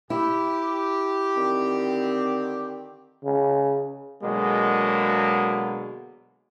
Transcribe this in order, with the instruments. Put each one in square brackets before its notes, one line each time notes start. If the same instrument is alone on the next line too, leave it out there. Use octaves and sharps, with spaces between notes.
[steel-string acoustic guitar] E4 [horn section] G4
[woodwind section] D3 D#3 C4
[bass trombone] C#3
[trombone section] B2 D3 F#3 G#3 A#3